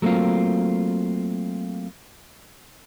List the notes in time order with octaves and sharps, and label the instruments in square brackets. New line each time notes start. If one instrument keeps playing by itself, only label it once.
[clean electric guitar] F#3 A3 A#3 C4 F4